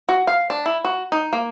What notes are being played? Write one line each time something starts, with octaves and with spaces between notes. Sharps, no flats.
F#4
F5
D4
E4
F#4
D#4
A#3